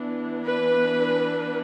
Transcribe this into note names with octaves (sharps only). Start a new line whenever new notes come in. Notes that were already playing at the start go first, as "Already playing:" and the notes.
Already playing: E3 B3 D4
B4